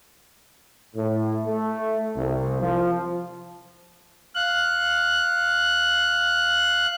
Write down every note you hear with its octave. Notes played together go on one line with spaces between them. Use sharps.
A2
A3
C2
F3
F5 F#6